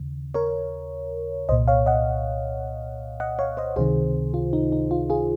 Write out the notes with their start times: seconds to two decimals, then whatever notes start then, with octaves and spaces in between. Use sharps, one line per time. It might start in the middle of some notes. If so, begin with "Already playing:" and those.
Already playing: D#2 C#3
0.34 A#4 C#5
1.49 C2 C5 D#5
1.52 A#2
1.68 C#5 F5
1.86 D#5 F#5
3.20 D#5 F#5
3.39 C#5 F5
3.57 C5 D#5
3.76 C#2 C3 D#3 G#4 C5
4.34 F4
4.53 D#4
4.72 D#4
4.91 F4
5.10 F4 G#4